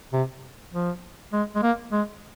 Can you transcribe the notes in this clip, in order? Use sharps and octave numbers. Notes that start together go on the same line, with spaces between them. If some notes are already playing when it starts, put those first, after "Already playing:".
C3
F3
G#3
G#3
A#3
G#3